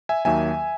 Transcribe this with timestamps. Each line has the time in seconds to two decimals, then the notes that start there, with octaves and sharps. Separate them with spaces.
0.09 E5 G#5
0.25 D#2 D#3 F#3 A#3 E5 G#5